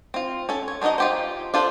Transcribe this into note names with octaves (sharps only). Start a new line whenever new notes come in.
C4 F4
C#4 A4
C#5
G#3 D4 D#4 F#4 D#5
F4 G4 C5
D4 F4 A4 C5